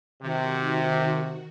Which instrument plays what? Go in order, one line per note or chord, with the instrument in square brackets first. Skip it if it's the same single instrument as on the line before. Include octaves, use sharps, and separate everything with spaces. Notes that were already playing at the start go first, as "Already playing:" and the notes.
[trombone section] C3 [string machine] D#3 F#4